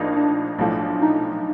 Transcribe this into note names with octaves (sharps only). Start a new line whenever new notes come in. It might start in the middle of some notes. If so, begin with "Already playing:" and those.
Already playing: A#1 A2 F3 A#3 D4 D#4
D4
B1 A2 F3 A3
D#4